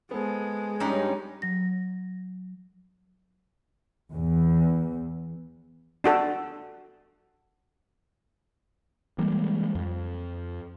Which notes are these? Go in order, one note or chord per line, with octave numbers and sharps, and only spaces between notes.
G#3 B3 A4 C5
G2 G3 C#4 D#4 G4
F#3 A#6
E2
D4 F#4 A4
E3 G3 G#3 A#3
F2